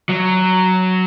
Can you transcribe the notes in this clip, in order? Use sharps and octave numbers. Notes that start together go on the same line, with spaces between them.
F#3